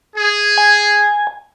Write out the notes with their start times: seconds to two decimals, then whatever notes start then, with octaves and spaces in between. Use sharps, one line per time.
0.15 G#4
0.58 G#5